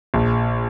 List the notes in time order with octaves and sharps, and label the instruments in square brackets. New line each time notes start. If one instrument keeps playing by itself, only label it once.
[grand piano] A#1